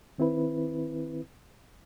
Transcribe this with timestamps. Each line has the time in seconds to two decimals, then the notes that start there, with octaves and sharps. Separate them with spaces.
0.18 D#3 C4 E4 B4